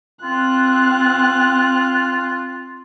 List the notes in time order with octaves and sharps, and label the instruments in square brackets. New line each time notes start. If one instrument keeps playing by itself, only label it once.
[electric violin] C4 F#6 [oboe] F4